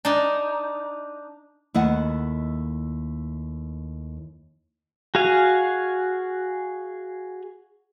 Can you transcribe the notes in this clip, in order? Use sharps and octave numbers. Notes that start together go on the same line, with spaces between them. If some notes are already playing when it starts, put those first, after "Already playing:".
D4 D#4
D#2 A3 E4 D#5 E5 F#5
F#4 G#4 F5 G#5